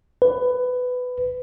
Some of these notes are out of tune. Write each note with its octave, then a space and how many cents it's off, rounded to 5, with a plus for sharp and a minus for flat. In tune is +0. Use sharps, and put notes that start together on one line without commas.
B4 +15